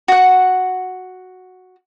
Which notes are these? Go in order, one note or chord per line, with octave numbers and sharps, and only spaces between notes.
F#4 F#5